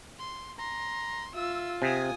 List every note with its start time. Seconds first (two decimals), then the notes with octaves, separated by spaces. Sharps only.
0.19 C6
0.59 A#5 C6
1.35 F4 E5 E6
1.82 C3 G#4 G#5 D#6